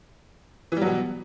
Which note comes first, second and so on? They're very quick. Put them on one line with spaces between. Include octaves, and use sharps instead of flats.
E3 G3 F#3 B2